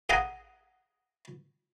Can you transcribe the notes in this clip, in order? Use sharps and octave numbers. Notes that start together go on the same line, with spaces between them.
G#4 F5 F#5 G#5 A#5